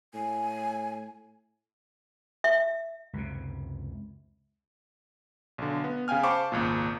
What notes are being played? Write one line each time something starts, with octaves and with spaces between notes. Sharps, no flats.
A2 G#5
E5
C#2 F#2 C3
B1 D3
B3
C#3 F5 G5 G#5 F6
C5 F5 A5 B5 C#6 D6
G#1 C#2 A#2